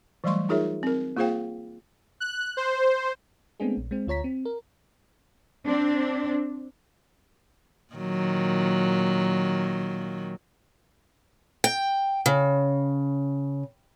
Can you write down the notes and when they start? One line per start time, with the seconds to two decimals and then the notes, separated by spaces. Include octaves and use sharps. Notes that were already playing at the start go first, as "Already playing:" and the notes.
0.24 E3 F#3 G3 A3 C6 C#6
0.49 D#4 F4 G#4 A#4 C#5 E5
0.83 C4 A#4
1.17 A#3 F4 G#4 C5 F5 G5
2.20 F#6
2.57 C5
3.60 G#3 A3 B3 C4 D4 G#4
3.77 A#1
3.91 G#3 C4
4.07 D2 F4 C#5 A#5 B6
4.24 C4
4.45 A#4
5.65 C4 D4
7.94 A#2 D#3 F#3
11.64 G5
12.26 C#3